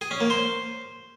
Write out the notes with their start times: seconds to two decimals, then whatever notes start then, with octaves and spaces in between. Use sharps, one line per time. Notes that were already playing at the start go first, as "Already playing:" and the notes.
0.01 G#4
0.11 C#4
0.21 A#3
0.30 C5